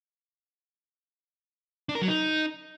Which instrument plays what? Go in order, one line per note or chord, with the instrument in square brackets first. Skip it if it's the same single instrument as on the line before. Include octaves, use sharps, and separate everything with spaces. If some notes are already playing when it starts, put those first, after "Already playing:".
[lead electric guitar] D4
A#4
F#3
D#4